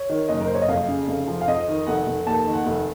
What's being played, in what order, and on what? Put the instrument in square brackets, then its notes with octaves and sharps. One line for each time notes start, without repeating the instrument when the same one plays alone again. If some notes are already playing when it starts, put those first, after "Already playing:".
Already playing: [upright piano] C#5
D#3
F#1 D#5
A#4
F#1 C5
C#5
D#5
F2 F5
C#3
F1
F3
F5
F2 D#5
D#3
F1 F#5
F1
D#2 A5
D#3
F#5
F1